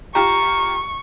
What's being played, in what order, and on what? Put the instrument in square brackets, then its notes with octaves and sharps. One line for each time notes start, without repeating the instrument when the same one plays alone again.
[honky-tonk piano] F4 G4 [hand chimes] A#5 [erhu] C#6